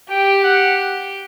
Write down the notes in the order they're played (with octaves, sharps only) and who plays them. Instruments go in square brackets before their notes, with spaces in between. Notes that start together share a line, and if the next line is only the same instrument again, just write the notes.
[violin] G4 [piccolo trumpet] G5
[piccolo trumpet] F#5